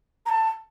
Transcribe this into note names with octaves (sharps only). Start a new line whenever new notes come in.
A#5
A5